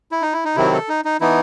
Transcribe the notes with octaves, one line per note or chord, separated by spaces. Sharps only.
E4
D#4
E4
D#4
C3 D#3 F#3 C4 E4
A4
D#4
D#4
E3 B3 D#4 E4